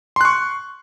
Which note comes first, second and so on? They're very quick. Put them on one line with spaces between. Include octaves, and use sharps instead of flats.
C6 F#6 C#6